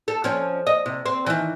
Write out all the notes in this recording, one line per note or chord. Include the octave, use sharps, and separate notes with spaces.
A4
F3 C#4
D#5
C3
C4
D#3 E3